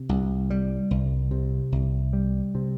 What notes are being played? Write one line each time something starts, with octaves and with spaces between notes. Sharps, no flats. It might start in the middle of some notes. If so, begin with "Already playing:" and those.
Already playing: C3
C2
G3
C2
C3
C2
G3
C3